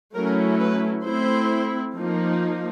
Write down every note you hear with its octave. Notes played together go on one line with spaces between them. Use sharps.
F#3 A3 C#4 E4 A#4
B4
A3 C4 E4 C5
F3 A#3 D#4